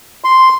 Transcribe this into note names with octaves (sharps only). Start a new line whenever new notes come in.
C6